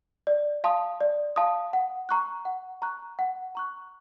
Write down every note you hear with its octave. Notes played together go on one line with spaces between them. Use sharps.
D5
F5 A5 C6 D#6
D5
F5 A5 C6 D#6
F#5
A#5 C#6 F#6
F#5
A#5 C#6 F#6
F#5
A#5 C#6 F#6